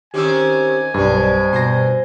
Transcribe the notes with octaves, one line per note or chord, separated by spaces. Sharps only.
D#3 C4 C#4 G4 G#5 D6 E6
B1 G2 B2 C4 D5
B2 C5 A#6